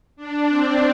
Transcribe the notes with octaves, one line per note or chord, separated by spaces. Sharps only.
D4
C4